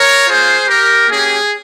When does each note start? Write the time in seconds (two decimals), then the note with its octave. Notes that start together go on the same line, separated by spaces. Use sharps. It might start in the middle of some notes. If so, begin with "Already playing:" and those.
Already playing: A#4 C#5
0.27 A#3 F4 G#4 C5
0.68 G4 A#4
1.08 A#3 C#4 G4 G#4